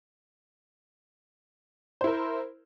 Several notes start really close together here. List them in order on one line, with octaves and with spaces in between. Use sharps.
C5 E4 A#4